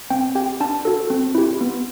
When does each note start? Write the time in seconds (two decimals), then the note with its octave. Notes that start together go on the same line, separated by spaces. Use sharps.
0.10 C4 G5
0.35 G4 G5
0.60 D4 A5
0.85 F#4 A4
1.10 C4
1.35 E4 G4
1.61 B3